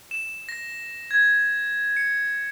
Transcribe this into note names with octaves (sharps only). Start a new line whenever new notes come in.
E7
A#6
G#6
C#7